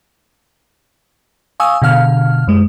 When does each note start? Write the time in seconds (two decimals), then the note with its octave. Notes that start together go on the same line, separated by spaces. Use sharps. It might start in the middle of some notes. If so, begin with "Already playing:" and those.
1.60 F5 G#5 C#6 D#6 E6
1.82 B2 D3 F5 F6
2.47 F#2 G#3